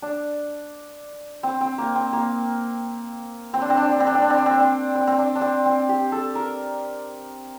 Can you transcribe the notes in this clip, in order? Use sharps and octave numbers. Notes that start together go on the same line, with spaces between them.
D4
C4
C4
A#3
C4
A#3
C4
D4
C4
D4
C4
D4
C4
D4
C4
D4
C4
D4
C4
D4
C4
C4
C4
D4
D4
C4
C4
G4
A4
A#4